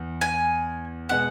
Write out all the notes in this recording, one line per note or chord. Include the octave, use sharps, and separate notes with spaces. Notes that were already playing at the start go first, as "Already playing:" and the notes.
Already playing: E2 E3
G#5
B2 G#3 B3 F#5